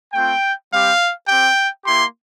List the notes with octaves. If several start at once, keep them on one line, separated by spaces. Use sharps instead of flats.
A3 C4 F4 G5
G3 C4 G4 F5
C4 G4 G5
A#3 E4 G4 C6